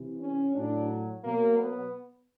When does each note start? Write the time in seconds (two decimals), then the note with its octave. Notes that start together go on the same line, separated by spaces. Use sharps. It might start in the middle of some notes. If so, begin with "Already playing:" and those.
Already playing: C3 E3
0.21 C#4
0.55 A2 F#3 D4
1.24 B2 F#3 A#3
1.58 B3